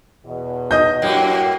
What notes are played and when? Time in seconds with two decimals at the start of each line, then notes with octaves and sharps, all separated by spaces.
0.25 E2 B2
0.71 D#5 G6
1.02 F#2 A2 A#3 F#4